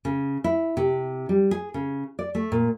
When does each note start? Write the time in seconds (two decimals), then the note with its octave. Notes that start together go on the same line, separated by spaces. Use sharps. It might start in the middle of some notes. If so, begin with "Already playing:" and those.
0.05 C#3
0.44 E4
0.77 C3
1.29 G3
1.51 G#4
1.74 C#3
2.19 D5
2.35 A3
2.52 A#2